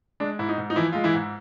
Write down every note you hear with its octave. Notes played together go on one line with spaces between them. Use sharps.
G#3 D4
G#2 E4
D#4
G#2
D#4
E3 F3 E4
G#3 F4
E3 E4
G#2